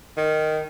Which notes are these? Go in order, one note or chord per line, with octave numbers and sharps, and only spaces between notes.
D#3